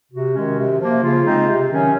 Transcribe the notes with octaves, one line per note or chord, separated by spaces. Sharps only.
C3 F#4
D#3 G#3 C#4
C3
F3 A#3
C#3 F4
G#3 C4 D#4
C3
D#3 F#3 C#4